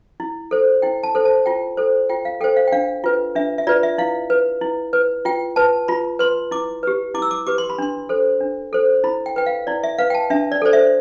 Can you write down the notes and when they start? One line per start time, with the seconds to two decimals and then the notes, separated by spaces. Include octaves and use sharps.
0.20 E4
0.51 A4 C5
0.82 E4 G5
1.03 A5
1.15 A4 C5
1.25 A5
1.46 F4 G5
1.77 A4 C5
2.09 F4 G5
2.25 F5
2.41 A4 C5 G5
2.56 F5
2.68 G5
2.72 D4 F5
3.04 F4 B4
3.35 D4 E5
3.58 E5
3.67 F4 B4 D5
3.83 E5
3.98 E4 F5
4.30 B4
4.61 E4
4.93 B4
5.25 F4 G5
5.56 B4 A5
5.88 F4 B5
6.19 B4 C6
6.51 E4 D6
6.83 G4 B4
7.14 E4 D6
7.22 E6
7.31 D6
7.47 G4 B4 D6
7.58 C6
7.70 B5
7.78 D4 C6
8.09 A4 C5
8.40 D4
8.73 A4 C5
9.04 E4 B5
9.26 G5
9.36 B4 G5
9.46 F5
9.67 E4 D5
9.84 E5
9.98 B4 F5
10.10 G5
10.15 A5
10.30 D4 E5
10.52 D5
10.62 A4 C5 D5
10.73 E5